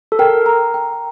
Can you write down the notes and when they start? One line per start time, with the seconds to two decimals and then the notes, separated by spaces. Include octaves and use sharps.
0.12 A4
0.19 A#4 G5
0.46 A#5
0.74 G5